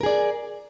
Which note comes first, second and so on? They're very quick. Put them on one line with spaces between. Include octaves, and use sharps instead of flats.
A#4 G#4 D5